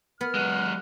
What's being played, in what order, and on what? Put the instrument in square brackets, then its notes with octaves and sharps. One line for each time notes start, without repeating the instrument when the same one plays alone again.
[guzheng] B3 [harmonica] F6
[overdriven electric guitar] F#3 G#3 [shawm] F#5